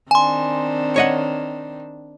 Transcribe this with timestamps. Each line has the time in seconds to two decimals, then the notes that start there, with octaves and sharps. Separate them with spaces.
0.11 D#3 C4 D4 G#5 C6
0.96 C#5 D#5 F#5